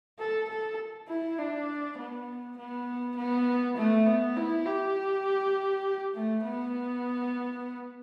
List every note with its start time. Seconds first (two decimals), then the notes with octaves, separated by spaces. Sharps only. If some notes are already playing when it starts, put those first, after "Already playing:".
0.19 A4
0.49 A4
1.08 E4
1.38 D4
1.98 B3
2.57 B3
3.17 B3
3.77 A3
4.06 B3
4.36 E4
4.66 G4
6.15 A3
6.44 B3